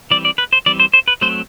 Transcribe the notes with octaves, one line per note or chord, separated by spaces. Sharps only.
E3 G3 C4 D5
D5
B4
C5
E3 G3 C4 D5
C5
C5
B4
F#3 A3 C4 C5